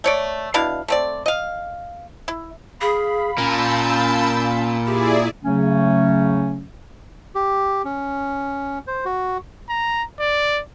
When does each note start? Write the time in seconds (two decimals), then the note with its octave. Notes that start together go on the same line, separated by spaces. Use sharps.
0.04 A3 C#5 D5
0.54 B2 D4 E4 F5
0.88 A3 C4 D5
1.26 D#5 F5
2.28 E4
2.81 G#4 F5 B5
3.38 A#2 A#3 C#4 A5 E6 G6
4.86 E4 G4 G#4 D5
5.44 C#3 F#3 A3 C#4
7.35 G4
7.85 C#4
8.87 C5
9.05 F#4
9.69 A#5
10.20 D5